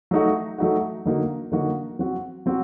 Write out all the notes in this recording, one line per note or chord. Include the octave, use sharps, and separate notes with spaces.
F#3 A3 D#4 F#4
F#3 A3 D#4 F#4
D3 F#3 A#3 D#4 F#4
D3 F#3 A#3 D#4 F#4
F#3 C4 F#4
F#3 C4 F#4